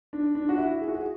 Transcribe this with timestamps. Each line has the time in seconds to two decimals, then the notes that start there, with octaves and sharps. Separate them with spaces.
0.13 D4
0.35 D4
0.49 F#4
0.58 E4
0.81 G#4
0.88 F#4
0.95 G#4